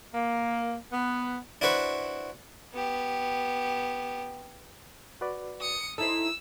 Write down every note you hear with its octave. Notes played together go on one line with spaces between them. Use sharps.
A#3
B3
D4 E4 F#4 B4 C5 C#6
B3 G4
F#4 B4 D5
D#6 C#7
D#4 E4 A4 C5 E6